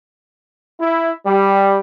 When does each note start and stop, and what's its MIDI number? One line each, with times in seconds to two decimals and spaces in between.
0.80 1.12 64
1.26 1.79 55